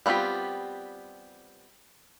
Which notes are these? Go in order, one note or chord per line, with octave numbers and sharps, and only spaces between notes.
G3 B3 C4 F4 G4